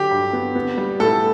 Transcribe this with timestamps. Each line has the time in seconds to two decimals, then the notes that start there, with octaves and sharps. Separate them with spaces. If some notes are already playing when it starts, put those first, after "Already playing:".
Already playing: D3 F#3 G4
0.11 G2
0.33 B3
0.55 B3
0.77 G3
1.00 A2 A4